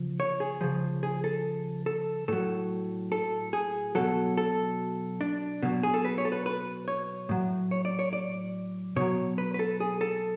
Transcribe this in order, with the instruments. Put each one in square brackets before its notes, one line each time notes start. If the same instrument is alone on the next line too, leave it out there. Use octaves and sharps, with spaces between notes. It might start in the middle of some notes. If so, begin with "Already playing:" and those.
Already playing: [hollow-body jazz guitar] C#3 F3
C#5
G#4
C#3 F3
G#4
A4
A4
A2 F#3 A4
A4
G#4
B2 F#3 A4
A4
D4
B2 F#3
G#4
A4
B4
C#5
A4
B4
B4
C#5
A2 F#3
C#5
D5
C#5
D5
B2 F#3 C#5
B4
B4
A4
G#4
A4